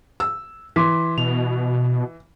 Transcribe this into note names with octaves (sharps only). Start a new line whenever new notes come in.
E6
E3 C6 D6 B6
B2 F7